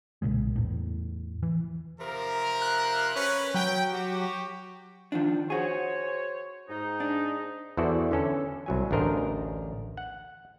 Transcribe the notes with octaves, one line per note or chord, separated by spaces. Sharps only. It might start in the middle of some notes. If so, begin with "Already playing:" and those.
B1 A#2 C#3 G#3
E2 A2
E3
C3 F3 A#4
F#6
C#4 B4
F#3 G5
F#4 G4
D#3 F3 D4
F#4 G#4 C5 C#5
G#2 D#4
D4
E2 E3 F#4 A4 C5 D5
D3 E3 C#4 A4
C2 F#3 G#5
A1 D2 D4 A#4 C5 D#5
F#5